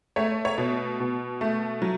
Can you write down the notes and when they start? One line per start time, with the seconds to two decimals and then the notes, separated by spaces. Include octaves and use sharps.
0.16 A3 C#5
0.45 C#5
0.58 B2
1.00 B2
1.41 A3
1.82 F#3